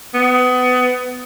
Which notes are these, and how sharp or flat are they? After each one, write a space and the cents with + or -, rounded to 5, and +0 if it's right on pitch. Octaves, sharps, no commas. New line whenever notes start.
B3 +25